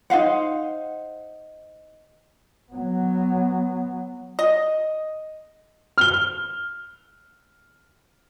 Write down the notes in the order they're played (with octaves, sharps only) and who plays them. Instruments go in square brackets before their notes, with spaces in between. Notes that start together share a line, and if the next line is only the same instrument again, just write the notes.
[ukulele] D#4 C5 F5 F#5
[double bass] F#3 B3
[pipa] D#5
[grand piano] F6 G7